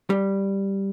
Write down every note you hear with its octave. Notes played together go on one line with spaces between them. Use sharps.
G3